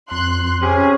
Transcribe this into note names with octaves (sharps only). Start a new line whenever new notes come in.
F2 C6 F#6
C3 C#4 G#4